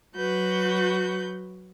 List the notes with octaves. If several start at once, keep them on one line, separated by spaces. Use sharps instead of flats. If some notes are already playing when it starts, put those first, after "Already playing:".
F#3 F#4 B4 G6